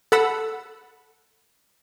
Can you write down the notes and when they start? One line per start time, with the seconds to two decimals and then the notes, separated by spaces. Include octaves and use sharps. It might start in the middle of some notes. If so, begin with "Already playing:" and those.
0.12 A4 F#5 B5 E6